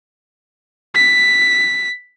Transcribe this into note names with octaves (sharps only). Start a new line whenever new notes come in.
B6